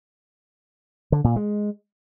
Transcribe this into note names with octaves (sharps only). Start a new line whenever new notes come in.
D3
A#2
G#3